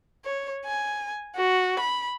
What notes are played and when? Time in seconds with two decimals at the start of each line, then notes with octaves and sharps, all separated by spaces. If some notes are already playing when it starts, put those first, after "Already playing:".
0.24 C#5
0.65 G#5
1.36 F#4
1.80 B5